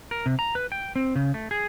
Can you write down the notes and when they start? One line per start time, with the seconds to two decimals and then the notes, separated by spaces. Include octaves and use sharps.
0.11 A#4
0.26 C3
0.39 A#5
0.55 B4
0.72 G5
0.96 C4
1.16 C#3
1.34 A3
1.51 G#4